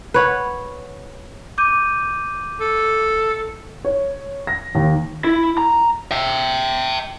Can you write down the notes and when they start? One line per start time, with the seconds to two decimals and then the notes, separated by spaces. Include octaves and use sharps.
0.14 B4 C#5 F#5
1.58 D6 G6 D#7
2.60 A4
3.85 C#5
4.47 A#6
4.75 D#2
5.24 E4
5.58 A#5
6.11 E5 G5